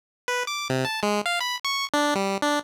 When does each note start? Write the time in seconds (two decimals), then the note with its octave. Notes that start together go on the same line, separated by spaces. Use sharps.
0.28 B4
0.47 D6
0.70 C3
0.85 A5
1.03 G#3
1.26 F5
1.41 B5
1.65 C#6
1.94 D4
2.15 G3
2.42 D4